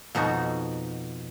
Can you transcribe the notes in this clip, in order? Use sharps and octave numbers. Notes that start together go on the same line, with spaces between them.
F2 B2 D#4 F#4